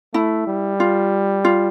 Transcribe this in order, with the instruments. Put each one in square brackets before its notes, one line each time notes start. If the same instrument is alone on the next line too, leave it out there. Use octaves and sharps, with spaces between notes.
[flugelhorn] A3 [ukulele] E4
[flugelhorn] G3
[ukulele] F4
F4